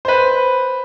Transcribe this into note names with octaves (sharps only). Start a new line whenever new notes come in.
B4 C5